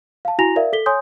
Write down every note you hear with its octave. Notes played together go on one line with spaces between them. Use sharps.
F5 A5
E4 F#4 G#5 A#5 A#6 F7
A#4 D5 E5 F5
A4 B6 G7
C#5 G#5 C6 D#6 G6